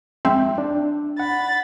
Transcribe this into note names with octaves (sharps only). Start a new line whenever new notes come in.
F3 G#3 C4 E5 G5
D4
F#5 B5 A6